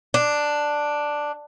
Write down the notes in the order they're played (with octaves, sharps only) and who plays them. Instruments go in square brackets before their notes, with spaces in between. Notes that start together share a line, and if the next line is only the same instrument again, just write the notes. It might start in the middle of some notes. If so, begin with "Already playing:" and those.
[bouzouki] D4